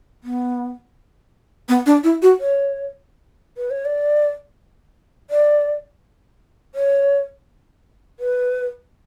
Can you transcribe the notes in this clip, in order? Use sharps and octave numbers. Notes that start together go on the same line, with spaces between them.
B3
B3
D4
E4
F#4
C#5
B4
C#5
D5
D5
C#5
B4